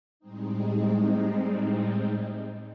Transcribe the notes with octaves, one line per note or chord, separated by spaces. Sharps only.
A2 G3 G#3 C4 D#4